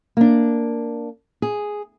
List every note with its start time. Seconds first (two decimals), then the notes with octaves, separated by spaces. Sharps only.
0.17 A#3 D4
1.42 G#4